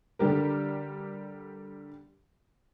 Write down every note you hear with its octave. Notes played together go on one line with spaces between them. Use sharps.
D3 G3 G4 A#4